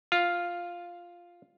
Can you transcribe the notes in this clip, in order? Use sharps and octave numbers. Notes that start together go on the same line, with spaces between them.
F4